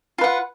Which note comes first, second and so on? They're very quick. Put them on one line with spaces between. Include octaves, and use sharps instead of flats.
F4 B4 F#5